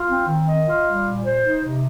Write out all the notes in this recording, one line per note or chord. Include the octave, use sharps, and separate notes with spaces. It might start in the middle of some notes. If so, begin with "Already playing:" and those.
Already playing: F4
C4
D#3
D#5
F4
G3
A#2
C5
D#4
C3